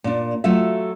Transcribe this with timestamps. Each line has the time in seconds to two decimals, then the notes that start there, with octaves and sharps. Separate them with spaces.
0.04 A#2 D4
0.44 F#3 A3 F4 F#4 E5